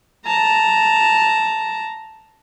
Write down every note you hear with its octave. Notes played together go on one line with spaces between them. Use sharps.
A5 A#5